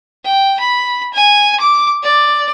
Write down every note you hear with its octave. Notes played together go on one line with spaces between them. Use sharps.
G5
B5
G#5
D6
D5